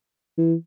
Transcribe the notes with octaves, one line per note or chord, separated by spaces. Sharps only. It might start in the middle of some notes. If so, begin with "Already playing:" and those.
E3